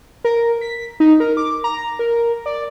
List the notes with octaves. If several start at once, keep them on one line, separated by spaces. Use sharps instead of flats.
A#4
B6
D#4
A#4
D6
A#5
A#4
D5